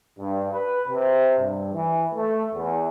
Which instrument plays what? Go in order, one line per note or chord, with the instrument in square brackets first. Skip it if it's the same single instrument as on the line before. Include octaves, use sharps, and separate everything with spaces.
[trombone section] G2
B4
C3
G2
E3
A3
E2